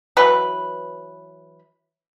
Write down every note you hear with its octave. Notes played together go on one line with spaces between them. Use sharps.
E3 F#3 B4 B5